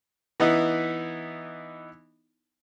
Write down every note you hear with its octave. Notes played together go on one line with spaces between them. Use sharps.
E3 B3 D#4 E4